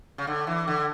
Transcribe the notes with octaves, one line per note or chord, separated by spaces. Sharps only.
C#3
D3
E3
D3